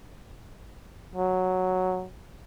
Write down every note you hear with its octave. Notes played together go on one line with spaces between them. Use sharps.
F#3